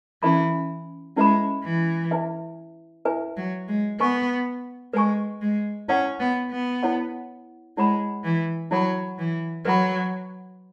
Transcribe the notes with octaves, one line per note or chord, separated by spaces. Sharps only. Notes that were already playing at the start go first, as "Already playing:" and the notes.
E3 C#4 E4 B4 E5 B5
G#3 C#4 E4 B4 E5 B5
E3
E4 B4 E5 G#5
E4 B4 E5 G#5
F#3
G#3
B3 B4 G#5 C#6
G#3 B4 G#5 C#6
G#3
C#4 E4 C#5 F#5
B3
B3
E4 C#5 F#5
G#3 E4 C#5 F#5 B5
E3
F#3 E4 C#5 F#5 B5
E3
F#3 B4 F#5 B5